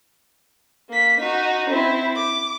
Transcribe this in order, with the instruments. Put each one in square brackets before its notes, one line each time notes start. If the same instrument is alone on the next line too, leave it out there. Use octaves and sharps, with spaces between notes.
[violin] A#3 B6
D#4 F#4
C4 E4
D6